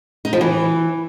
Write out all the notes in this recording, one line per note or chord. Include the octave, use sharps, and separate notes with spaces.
D#4
F3
E3